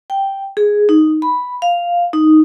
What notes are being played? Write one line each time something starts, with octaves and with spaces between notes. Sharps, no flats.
G5
G#4
D#4
B5
F5
D#4